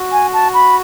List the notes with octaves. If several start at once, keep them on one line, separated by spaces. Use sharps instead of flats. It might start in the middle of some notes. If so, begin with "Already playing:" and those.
Already playing: F#4
G#5
A5
B5